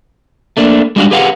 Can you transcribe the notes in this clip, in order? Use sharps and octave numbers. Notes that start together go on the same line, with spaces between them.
A3 A#3 D4
G3 G#3 D4 F#4 F5
G4 G#4 B4 F5 F#5